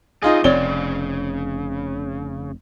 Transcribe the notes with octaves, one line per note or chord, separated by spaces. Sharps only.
C2 D#4 F4 G#4 D#5
F1 C#3 C4 C#5 D5 G7